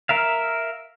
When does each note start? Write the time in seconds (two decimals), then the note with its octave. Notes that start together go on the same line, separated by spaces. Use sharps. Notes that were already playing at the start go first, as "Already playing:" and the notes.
0.09 A#4 E5 F5